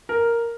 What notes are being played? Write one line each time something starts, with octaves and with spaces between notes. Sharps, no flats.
A#4